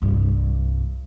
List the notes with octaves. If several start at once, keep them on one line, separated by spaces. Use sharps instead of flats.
C2 G2